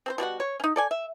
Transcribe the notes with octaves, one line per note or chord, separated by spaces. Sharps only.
C4 A4 C5
B2 G3 F#4 F#5
C#5
C#4 D#4
A4 D5 G#5
E5